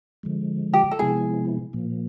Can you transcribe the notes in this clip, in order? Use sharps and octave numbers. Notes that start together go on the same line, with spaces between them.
D3 F3 G#3
G4
A4
C3 F3 G#3 B3 E4 G#4
A#2 F3 A#3